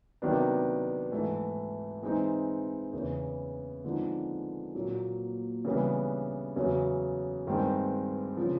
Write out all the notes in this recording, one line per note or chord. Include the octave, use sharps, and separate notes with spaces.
C3 D#3 F#3 B3 D4
G#2 E3 A3
E3 G#3 C4 D#4
E2 C#3 E3
D3 F3 G#3 C4 D#4
A#2 F#3 A#3
C#3 E3 G3 B3 D4
E2 C#3 F#3
G2 D#3 G#3 C4
C#3 F3